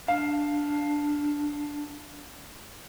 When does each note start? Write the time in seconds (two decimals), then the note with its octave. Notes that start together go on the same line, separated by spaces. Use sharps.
0.08 D4 F5